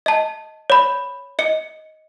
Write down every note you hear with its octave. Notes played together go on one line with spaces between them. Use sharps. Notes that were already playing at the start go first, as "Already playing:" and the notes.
D#5 A5
C#5 B5
D#5 C#7